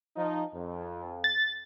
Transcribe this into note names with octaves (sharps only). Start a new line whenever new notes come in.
F3 D#4
F2
A6